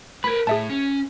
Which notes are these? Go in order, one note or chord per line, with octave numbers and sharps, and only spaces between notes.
A#4 B4 B5 G#6
A2 G#4 E5 A5
C#4